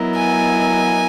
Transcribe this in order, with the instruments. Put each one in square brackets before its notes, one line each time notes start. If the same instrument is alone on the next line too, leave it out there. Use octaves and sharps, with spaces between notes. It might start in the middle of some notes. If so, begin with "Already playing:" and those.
Already playing: [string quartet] F#3 B3 E4 A#4 D#5
[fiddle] G#5